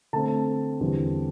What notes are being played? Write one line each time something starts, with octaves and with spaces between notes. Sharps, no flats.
D3 A3 C4 A5
E2 D3 G3 C4